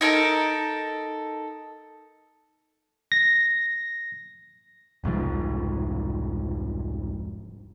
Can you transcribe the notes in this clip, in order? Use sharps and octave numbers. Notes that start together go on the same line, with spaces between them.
D#4 E4 A4 A#4
A#6
E1 C2 G#2 F3